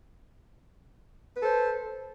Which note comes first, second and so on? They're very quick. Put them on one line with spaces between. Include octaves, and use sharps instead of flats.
B4 A4 C5